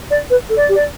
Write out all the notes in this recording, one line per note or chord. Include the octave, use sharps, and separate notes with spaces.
D5
B4
A4
D5
G4
D5